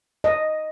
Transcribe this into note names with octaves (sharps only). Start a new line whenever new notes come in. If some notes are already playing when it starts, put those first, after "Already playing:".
D#5